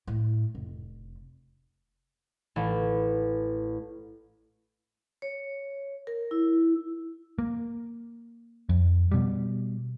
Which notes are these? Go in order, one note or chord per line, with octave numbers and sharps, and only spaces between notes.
A2
F1
A1
C#5
A#4
E4
A#3
F2
B2 G3